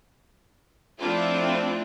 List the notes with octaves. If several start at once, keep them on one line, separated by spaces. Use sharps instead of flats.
F3 A3 C4 D4 E4 F4